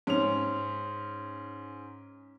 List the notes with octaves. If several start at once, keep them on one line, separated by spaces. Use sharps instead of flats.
G#2 C#4 F7